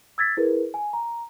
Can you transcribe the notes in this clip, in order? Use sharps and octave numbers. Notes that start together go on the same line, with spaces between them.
E6 G#6 A6 B6
E4 G#4 A#4 B4
G#5
A#5